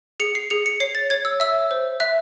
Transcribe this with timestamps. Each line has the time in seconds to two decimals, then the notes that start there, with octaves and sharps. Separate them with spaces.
0.20 G#4 C#7
0.35 C7
0.50 G#4 C#7
0.66 C#7
0.80 C#5 C7
0.95 A6
1.10 C#5 G#6
1.25 E6
1.40 E5 E6
1.71 C5
2.00 E5 F#6